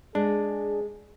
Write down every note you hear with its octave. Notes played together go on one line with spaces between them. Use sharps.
G#3 D4 G#4